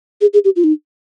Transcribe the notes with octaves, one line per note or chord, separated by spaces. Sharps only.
G#4
G#4
G4
F4
D#4